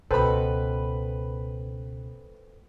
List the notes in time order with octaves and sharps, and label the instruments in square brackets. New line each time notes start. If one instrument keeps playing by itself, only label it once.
[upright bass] C#2 B2 [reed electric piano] A4 C5 G5 [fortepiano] B4 B5